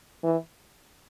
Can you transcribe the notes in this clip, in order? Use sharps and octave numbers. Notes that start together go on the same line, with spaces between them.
E3